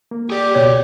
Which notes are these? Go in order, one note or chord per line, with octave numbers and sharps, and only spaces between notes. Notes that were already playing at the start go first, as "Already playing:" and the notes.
A#3
G4 G#4 D5
C#2 B2 C#5 G#6